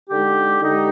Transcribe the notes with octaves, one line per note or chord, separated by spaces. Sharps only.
D3 G#3 D#4 G4
D3 G#3 D#4 G4